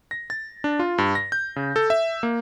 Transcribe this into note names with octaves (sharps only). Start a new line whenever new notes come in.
A#6
A6
D4
F4
G2
A#6
G6
C#3
A4
E5
A#3